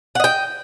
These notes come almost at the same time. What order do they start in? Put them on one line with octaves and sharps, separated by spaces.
F#5 D#5 G5